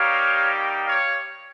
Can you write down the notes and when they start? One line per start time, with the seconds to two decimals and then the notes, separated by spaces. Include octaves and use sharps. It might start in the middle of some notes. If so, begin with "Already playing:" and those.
Already playing: G3 A#3 D#4 G4 C#5 F5
0.87 C#5 F5